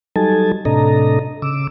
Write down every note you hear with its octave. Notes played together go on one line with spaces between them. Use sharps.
F#3 G3 D#4 A4 G#5 A5
A2 C3 D4 A4 D#5 A#5
C#3 D6 E6